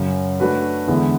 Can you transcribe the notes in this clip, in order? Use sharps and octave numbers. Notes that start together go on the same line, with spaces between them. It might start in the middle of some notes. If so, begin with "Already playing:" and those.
Already playing: F#2 C#3 F#3
A3 D4 F#4 B4
E2 D3 G#3 B3 E4